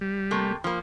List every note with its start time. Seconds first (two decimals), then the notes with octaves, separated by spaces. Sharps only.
0.01 G3
0.31 C3 A3 A#3
0.64 F3 A#3